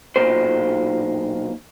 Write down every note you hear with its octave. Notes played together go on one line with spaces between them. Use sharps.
B1 A#2 C5